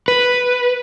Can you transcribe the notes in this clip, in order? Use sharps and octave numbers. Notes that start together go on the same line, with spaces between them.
B4